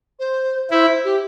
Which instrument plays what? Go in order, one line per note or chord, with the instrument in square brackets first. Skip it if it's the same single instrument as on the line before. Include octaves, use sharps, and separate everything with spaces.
[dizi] C5
[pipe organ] E4 [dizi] C5
[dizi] G4